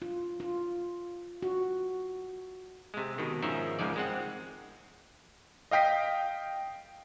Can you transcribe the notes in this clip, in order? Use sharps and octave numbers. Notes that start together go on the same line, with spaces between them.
F4
F4
F#4
C3 G#3
B2 D#3
G#2 D#3 F3 C#4 A#4 E5
C#2 G#2 F3 G#3 D5
G#3 C4 F#5
D#5 F5 G5 D#6 B6